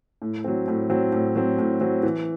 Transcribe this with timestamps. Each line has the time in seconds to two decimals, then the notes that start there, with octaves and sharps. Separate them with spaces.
0.22 A2
0.44 F#3 C4
0.68 A2
0.90 F#3 C4
1.12 A2
1.36 F#3 C4
1.58 A2
1.81 F#3 C4
2.03 E3